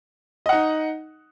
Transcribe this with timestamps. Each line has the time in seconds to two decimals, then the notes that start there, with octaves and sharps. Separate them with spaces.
0.46 D#5
0.49 F#5
0.52 D#4